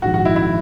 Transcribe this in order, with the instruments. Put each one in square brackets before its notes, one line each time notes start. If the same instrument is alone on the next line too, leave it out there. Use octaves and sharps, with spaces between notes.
[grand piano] A#1 G#2 D#3 [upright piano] F#4
[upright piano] F#4
E4
E4